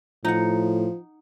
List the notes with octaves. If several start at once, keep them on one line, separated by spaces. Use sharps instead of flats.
A2 F3 D#4 F#5